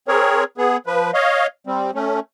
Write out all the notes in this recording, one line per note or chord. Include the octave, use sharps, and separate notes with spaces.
C4 G#4 A#4 C#5
B3 G#4
F3 B4
C#5 D#5 F5
G3 C4
A3 C#4